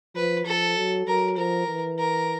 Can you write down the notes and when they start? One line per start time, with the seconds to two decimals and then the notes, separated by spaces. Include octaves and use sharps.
0.15 F3 B4
0.46 F3 A4
0.77 F#3
1.07 F#3 A#4
1.37 F3 A#4
1.68 E3
1.99 A#4